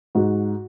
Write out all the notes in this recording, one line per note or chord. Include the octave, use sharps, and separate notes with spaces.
G#2 F#4